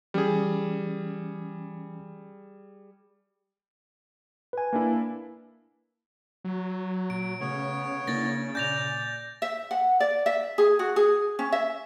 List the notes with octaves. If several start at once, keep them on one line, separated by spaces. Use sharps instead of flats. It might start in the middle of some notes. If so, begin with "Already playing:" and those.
E3 G3 C#4 G#4
B4 G#5
A#3 D4 E4
F#3
A#2 D7
C#3 A3 B3 C#5
C#3 A#3 D4 E4 A6 A#6
A#2 D5 G#5 G6 A#6 F7
E5
F#5
D5
E5
G#4
F#4
G#4
C#4
E5